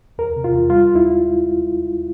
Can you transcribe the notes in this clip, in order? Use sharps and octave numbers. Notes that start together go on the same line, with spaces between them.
E2 A#4
C3
F4
E2
G3 F4
D#2
E4